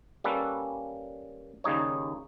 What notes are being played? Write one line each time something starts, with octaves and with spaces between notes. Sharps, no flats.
G3 A#3 C#4 A4 B4
D#2 C#3 G3 D#4 C#5